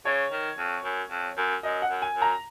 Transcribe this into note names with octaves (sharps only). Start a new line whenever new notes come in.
C#3 C#5
D#3
F2
F#2
F2
F#2
F#2 D#5
F#5
F#2
G#5
F#2
A#5